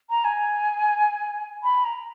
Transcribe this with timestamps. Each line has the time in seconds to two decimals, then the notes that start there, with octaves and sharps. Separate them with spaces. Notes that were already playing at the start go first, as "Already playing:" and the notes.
0.09 A#5
0.24 G#5
1.63 B5
1.84 A#5